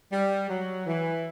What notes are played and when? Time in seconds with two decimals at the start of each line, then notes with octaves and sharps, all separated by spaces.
0.12 G3
0.49 F#3
0.86 E3